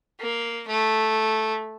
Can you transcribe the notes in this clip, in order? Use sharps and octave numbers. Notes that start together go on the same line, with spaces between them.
A#3
A3